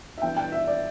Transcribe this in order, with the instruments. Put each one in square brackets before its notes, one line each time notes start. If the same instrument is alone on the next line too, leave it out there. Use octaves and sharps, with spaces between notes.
[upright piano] E5
G2 E3 B3 E4 G5
G5
E5
D5